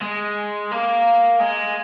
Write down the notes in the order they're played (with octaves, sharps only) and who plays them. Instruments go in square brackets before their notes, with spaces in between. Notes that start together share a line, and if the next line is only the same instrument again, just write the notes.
[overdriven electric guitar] G#3
A#3
G#3